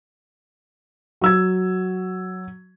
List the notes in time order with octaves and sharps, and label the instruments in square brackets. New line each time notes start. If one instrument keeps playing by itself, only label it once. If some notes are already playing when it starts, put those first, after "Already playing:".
[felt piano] F#3 E6 G#6